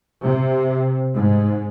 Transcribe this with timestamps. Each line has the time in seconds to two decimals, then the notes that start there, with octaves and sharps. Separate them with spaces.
0.22 C3
1.14 G#2